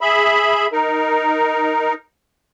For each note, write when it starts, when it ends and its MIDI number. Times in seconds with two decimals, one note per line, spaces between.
0.01 0.67 68
0.01 0.67 76
0.01 0.67 83
0.72 1.94 63
0.72 1.94 70